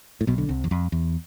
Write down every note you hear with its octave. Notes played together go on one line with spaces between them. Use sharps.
A2
B1 B2
D3
C2 C3
E2
F2
E2